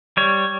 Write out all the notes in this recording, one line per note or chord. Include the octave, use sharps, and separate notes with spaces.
G3 C#5